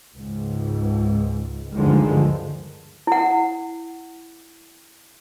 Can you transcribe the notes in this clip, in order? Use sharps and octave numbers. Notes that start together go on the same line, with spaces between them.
C#2 G#2
D2 G2 D3 D#3 F3 G#3
E4 F#5